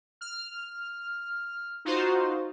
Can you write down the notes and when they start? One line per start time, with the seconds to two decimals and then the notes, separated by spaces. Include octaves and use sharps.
0.21 F6
1.85 D#4 F4 F#4 C5